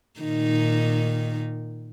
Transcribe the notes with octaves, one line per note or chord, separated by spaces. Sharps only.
A#2 D#3 D#4